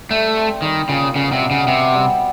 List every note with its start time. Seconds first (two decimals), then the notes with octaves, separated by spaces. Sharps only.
0.10 G3 A3
0.36 C4
0.62 D#3 G3
0.88 A#2 C#3
1.15 C#3 B3
1.32 C3
1.42 B2
1.51 C#3
1.67 C3 B3
1.94 G3